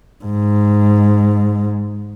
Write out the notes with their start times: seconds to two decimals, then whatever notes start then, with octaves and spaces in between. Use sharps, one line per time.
0.25 G#2